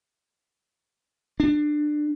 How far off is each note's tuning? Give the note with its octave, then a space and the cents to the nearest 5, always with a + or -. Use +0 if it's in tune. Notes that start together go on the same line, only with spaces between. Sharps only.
D4 +20